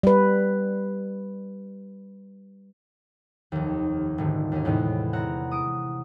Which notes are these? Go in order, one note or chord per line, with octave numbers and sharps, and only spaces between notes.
G3 B4
F1 D#2
D#1 G#1 D3
D#2 G#2 C#4
E2 A2 C3 G#3 B3
C4 E4 F#5 A#5
D#6 D7